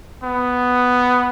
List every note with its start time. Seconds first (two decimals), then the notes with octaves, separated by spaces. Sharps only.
0.23 B3